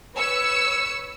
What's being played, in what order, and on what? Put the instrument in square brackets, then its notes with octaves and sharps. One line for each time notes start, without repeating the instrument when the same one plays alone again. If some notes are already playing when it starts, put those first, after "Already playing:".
[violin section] B4 C#5 E6 C#7